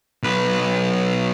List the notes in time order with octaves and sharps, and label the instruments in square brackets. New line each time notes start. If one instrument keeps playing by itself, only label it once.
[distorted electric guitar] B1 B4